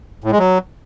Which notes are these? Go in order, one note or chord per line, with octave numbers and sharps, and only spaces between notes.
A2
G#3
F#3